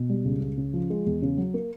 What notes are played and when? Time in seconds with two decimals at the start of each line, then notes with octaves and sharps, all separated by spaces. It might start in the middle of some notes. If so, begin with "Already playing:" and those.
Already playing: B2
0.09 G3
0.25 C#2
0.41 C#2
0.57 C#3
0.73 F3
0.90 G#3
1.06 E2
1.22 C#3
1.38 F#3
1.54 A#3